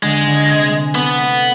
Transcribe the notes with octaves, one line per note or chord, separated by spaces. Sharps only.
D3 G#3
D3
C3
G#3
A3 B3
A3